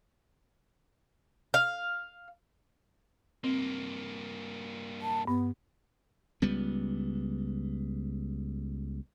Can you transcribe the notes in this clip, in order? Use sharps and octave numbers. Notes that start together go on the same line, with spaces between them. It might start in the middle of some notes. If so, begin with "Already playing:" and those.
F5
G2 A#3 C4
A5
G2 B3
C#2 G3 B3